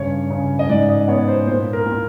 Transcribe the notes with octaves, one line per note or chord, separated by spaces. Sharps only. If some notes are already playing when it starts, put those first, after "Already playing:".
Already playing: G2 C#3 C#5
C#3
D#5
G#2 D5
D#5
B3 C#5
C5
A#2 C5
A#4
A#2